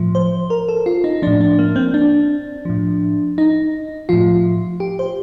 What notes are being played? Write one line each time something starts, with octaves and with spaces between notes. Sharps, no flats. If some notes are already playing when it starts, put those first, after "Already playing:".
Already playing: A2 F3
C5
A#4
A4
F4
D#4
A2 F3 D4
D4
A#3
C4
D4
A2 F3
D#4
A2 F3 F4
G4
C5